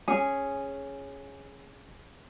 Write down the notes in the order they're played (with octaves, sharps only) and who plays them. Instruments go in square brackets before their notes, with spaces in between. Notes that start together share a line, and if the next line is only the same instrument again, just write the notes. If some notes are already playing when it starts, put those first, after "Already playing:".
[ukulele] C#4 G#4